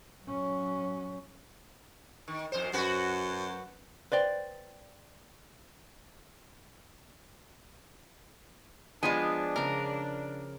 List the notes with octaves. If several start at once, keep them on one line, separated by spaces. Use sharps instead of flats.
F#3 C#4
D#3
F2 C5
F#2 F#4 B4
B4 C5 D5 G5
F3 G#3 B3 D4 F4 G#5
C#3 A#4 D6